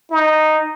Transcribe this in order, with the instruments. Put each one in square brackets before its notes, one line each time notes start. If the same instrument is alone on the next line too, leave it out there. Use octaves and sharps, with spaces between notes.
[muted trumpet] D#4